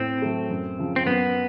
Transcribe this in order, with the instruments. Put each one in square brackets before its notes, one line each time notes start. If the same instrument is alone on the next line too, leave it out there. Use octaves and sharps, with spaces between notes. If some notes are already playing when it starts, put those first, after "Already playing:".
Already playing: [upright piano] A2 [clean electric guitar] C4
[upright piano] F#3 A3
F#2
C#3 F3
[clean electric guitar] C4
[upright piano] F#2 [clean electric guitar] B3